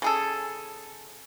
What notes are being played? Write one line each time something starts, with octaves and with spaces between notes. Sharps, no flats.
C#3 G#4 A4